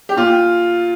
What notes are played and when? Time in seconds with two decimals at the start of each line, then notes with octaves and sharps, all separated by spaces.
0.09 G4
0.16 A#2 F4